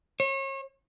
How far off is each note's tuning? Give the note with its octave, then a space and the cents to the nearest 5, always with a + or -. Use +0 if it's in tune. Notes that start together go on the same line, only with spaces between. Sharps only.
C#5 -35